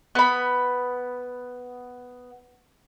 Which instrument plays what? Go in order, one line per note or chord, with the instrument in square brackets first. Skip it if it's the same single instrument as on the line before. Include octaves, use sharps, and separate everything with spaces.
[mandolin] B3 B5